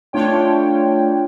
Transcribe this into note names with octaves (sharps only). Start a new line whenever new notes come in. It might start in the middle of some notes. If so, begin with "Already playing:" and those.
A3 D4 F4 C#5 G5